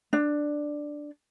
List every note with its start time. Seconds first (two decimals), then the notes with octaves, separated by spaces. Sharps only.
0.13 D4